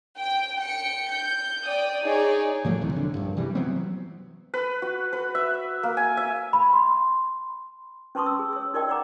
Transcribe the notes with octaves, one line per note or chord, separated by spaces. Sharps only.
G5
G5 C#7
G6
D5 G5 D#6
D#4 G#4 C#5 D5
A2 F3 F#3 A3
D2 C3 E3
E1 D3
A#1 G2
C3 E3 G3
E3 F#3 B3 C4
B4
F#4
B4
E5
A#3
G#5
E5
B5
C6
C#4 B4 A5 C6 C#6 D#6
E6
G#4
C#5 E6
D#4 A#4 D5 D#5 G5
C#5 D5 F#5 G5 A#5 D6